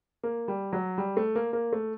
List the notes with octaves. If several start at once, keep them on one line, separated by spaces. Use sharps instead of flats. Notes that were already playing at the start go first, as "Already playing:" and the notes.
A#3
G3
F#3
G3
A3
A#3
A#3
A3